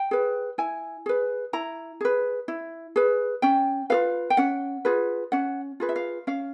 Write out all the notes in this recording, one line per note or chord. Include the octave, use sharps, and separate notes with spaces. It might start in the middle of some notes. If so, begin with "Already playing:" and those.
Already playing: G5
G#4 B4
E4 G#5
G#4 B4
E4 A#5
G#4 B4
E4
G#4 B4
C#4 G5
F4 G#4 B4 F5
G5
C#4 F#5
F4 G#4 B4
C#4 F#5
F4 G#4 B4
E5
F5
C#4 F5